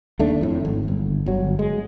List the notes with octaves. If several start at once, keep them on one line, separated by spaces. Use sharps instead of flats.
D#2 A3 D4
F2 A2
G#1
G1
G1 F#3
G#3